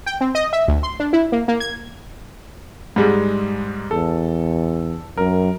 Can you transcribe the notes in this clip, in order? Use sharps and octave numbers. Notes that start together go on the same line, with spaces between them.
G5
C4
D#5
E5
D2
C6
D4
E4
A#3
A#3
G#6
G#2 G3 G#3
E2 A4
F#2 A#4